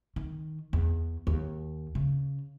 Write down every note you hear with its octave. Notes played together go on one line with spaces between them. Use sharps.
D#3
E2
D#2
C#3